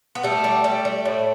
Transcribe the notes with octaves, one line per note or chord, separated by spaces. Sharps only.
B3
G3 A3
G3
G3
G3
A2